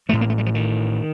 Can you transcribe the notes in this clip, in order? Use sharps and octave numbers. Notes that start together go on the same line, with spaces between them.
A1 A2 A3
A#3
A3
G3
F3
D#3